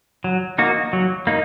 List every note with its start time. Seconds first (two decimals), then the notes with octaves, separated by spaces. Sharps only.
0.24 F#3
0.58 A#3 D#4 F#4
0.93 F#3
1.27 A#3 D#4